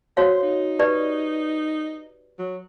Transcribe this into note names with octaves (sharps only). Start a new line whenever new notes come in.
F#4 C5 C#5 F5
D#4
G4 B4 D5
F#3